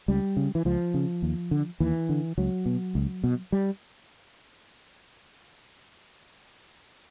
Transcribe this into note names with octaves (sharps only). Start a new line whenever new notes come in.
C#2 G3
C#3
E3
C#2 F3
C#3
D#2
D3
D#2 E3
D3
C#2 F#3
B2
C#2
B2
G3